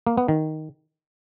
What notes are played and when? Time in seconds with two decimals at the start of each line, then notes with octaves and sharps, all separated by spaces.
0.07 A#3
0.18 B3
0.28 D#3